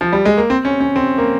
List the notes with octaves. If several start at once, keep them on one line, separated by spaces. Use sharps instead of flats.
F3
G3
G#3
A#3
C4
C#4
C#4
C4
A#3